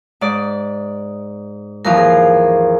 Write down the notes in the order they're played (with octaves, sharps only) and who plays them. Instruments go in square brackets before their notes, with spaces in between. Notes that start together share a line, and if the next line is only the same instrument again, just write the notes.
[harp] G#2 D5
[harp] D#2 E3 F3 [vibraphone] A#4
[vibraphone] G#4 A#4